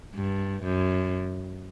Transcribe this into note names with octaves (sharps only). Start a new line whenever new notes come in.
G2
F#2